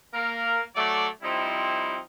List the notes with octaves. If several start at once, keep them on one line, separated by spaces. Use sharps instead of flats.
A#3 A#4
F#3 A3 D5
F3 G3 C4 D#4 E4